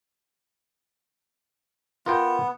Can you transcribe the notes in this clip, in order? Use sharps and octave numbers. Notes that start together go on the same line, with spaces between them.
B3 F4 A#4 G5